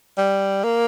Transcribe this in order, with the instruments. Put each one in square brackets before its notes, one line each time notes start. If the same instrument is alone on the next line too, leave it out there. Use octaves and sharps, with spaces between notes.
[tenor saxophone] G3
A#3